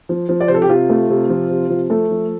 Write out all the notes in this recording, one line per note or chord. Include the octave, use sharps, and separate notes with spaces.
F3
F3
D5
C3 C5
A4
G4
C3 F4
A3
C3
F3
C3
F3
A3 A4
F3